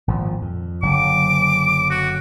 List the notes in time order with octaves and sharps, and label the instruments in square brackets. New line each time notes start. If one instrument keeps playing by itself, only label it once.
[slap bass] G#1 A#2 F3
F2
[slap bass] F#1 D3 F#3 [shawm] D6
[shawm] F#4